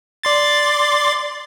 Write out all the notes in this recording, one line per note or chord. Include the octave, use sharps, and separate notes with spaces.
D5 C6 A6